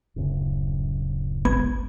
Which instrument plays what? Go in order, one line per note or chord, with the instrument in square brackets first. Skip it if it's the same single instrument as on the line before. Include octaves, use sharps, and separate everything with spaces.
[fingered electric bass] D1 F#2 C#3
[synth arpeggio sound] G#1 B3 G#6